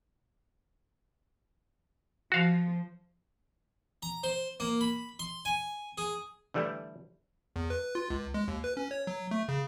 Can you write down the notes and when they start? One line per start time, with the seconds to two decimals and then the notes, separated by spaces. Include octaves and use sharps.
2.32 F3 F#4 F5
4.03 A#5
4.24 C5
4.60 A#3
4.81 B5
5.19 C6
5.45 G#5
5.98 G#4
6.54 D3 E3 G3 A3 E4
7.56 E2
7.70 B4
7.95 F4
8.10 C#2
8.34 G#3
8.48 D#2
8.64 B4
8.77 C#4
8.91 C#5
9.07 F#3
9.31 A3
9.49 C#3